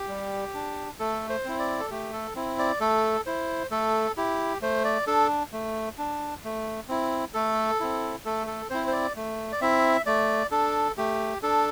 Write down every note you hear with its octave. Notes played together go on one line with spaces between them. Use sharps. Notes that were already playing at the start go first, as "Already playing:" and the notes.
Already playing: G4
G3
D4
A3 A4
C5
C4 E4
D5
A4
A3 G4
A4
C4 E4
D5
A3 A4
E4 C5
A3 A4
E4 G4
A3 C5
D5
D4 A4
A3
D4
A3
C4 E4
A3 A4
C4 E4
A3 A4
A4
C4 E4 C5
C5
D5
A3
D5
C4 E4 E5
A3 D5
D4 A4
A3 G4
D4 A4